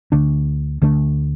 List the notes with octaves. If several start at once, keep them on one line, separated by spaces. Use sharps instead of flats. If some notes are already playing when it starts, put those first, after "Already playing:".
D2 D3 A3 D4
D2 D3 A3 D4